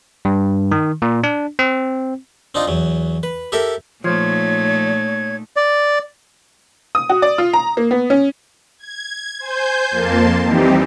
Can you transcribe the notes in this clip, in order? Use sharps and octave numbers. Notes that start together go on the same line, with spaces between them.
G2
D#3
A#2
D4
C4
C4 D4 D#4 F4
E2 F#3
B4
G4 A4 A#4 E5
A#2 F3 A3 D#4 C#5 G#6
D5
D#6
F#4
D5
F4
A#5
A#3
B3
C#4
G#6
C5 G#5 G6
F2 A#3 A5 C6
E3 G3 C4 D#4 G4